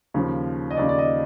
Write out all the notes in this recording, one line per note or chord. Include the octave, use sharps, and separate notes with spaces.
D#2 C#3 F3
D#5
D#2 C#3 F3 D5
D5
D#5